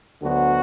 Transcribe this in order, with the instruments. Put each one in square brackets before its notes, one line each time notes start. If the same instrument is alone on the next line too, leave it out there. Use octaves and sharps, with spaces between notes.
[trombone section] D2 D3 F#3 B3 F#4